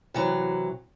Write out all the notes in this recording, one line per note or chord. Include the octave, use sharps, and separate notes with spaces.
C3 E3 F#3